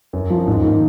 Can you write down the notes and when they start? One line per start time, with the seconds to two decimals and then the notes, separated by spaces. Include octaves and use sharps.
0.13 F#2
0.30 F3 C4
0.48 G#2
0.64 D#3 A#3